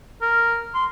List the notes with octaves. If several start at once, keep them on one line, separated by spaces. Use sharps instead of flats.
A#4
C6